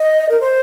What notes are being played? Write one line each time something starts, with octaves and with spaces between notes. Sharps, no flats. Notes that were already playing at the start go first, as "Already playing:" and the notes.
Already playing: D#5
A#4
C5